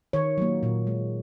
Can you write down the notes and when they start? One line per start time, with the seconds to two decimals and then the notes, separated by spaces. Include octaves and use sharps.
0.13 D#3 C#5
0.38 F#3 A#3
0.63 A#2
0.87 G#3